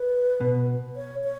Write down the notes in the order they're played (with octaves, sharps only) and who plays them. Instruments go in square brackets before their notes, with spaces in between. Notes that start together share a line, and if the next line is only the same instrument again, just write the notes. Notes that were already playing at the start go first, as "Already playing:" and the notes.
Already playing: [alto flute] B4
[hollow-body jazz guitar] B2
[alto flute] C#5
C#5